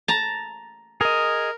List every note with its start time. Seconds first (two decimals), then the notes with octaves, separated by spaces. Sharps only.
0.08 A5 A#5
1.01 G#4 A#4 D#5